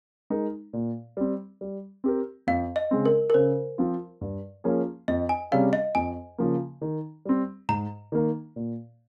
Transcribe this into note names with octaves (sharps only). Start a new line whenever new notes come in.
G#3 D#4 A#4
A#2
G3 C4
G3
C4 G4 A#4
F2 F5
D#5
C#3 G#3 C4
A#4
A#4
C#3 C5
F3 C4 F4
G2
F3 A#3 C#4 G#4
F2 D#5
G#5
C3 G3 C#4 G#4 F5
D#5
F2 G#5
C#3 F3 A#3
D#3
G3 C4
G#2 A#5
D#3 A#3
A#2